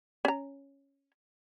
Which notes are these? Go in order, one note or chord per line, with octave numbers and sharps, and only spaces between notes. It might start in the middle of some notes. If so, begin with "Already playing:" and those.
C#4 A#5